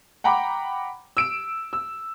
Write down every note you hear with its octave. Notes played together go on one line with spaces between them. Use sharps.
F#5 G5 A#5 B5 D6
E6 D7 E7
E6